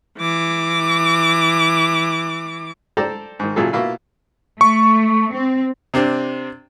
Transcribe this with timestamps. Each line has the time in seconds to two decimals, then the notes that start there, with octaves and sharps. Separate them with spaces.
0.18 E3 D6
2.97 A4 C5 D5 G5 A5 A#5
3.40 G#2 D#3
3.56 A#2 C#3 F#3 E4 G#4 A4
3.73 B2 A#3 E4 F4
4.61 A3 C#6
5.33 C4
5.94 C3 C4 D4